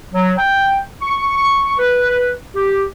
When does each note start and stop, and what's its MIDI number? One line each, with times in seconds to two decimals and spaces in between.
0.14 0.33 54
0.38 0.77 79
1.02 1.75 85
1.79 2.32 71
2.55 2.83 67